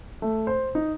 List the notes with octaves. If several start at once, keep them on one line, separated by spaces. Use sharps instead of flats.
A3
C5
D#4